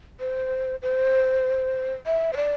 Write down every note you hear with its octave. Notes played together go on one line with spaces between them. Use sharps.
C5
C5
E5
C5
D5